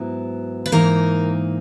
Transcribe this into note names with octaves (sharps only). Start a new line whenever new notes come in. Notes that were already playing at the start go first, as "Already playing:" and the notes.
Already playing: G#2 F#3 B3 E4
B4
G#2 E3 A#3 D#4 A#4